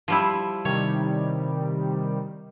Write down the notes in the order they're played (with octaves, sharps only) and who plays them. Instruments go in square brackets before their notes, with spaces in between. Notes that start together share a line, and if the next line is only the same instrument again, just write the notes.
[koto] F3 G3 E4
[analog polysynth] C3 D#3 G3 [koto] C#5